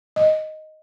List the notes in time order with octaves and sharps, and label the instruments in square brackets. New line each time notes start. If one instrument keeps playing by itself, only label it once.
[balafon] D#5